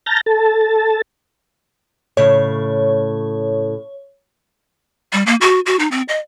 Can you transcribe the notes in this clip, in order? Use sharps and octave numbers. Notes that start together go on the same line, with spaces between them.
A5 A#5 F6 G6 A6 A#6
A4 A5
A2 C#3 C#5 E5
G3
A#3
F#4
F#4
D#4
C4
D#5